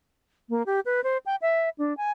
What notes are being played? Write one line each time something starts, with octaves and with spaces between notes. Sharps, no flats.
A#3
G4
B4
C5
G5
E5
D4
G#5